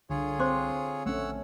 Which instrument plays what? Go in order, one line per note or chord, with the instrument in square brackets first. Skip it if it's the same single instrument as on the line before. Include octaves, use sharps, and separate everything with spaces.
[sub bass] C2 [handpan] D3 [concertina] F4 G#4 C#5
[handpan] C4 [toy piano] C5 C6 D6
[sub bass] A#1 [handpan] A3 C#4 [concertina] C#5 F#5 E6